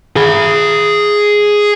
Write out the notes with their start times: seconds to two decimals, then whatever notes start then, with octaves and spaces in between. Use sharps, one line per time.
0.16 G#4 B5